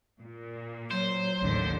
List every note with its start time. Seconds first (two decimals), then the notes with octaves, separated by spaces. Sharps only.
0.21 A#2
0.91 F#3 C5
1.40 A1 D#2 D3